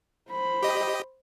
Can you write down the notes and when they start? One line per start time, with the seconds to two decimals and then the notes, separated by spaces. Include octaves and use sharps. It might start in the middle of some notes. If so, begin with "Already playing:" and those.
0.30 C5 B5
0.63 G4 D#5